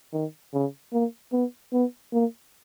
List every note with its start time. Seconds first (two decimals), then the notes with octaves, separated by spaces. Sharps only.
0.13 D#3
0.54 C#3
0.93 A#3
1.32 B3
1.72 B3
2.13 A#3